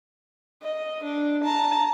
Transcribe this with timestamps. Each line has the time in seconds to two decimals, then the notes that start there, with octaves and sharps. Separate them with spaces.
0.63 D#5
1.05 D4
1.45 A5 A#5